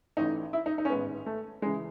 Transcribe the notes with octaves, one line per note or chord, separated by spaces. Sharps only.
A1 A2 E3 D#4
E4
D#4
D#4
C#4
A1 G#2 D#3 B3
A3
C#2 C#3 E3 G#3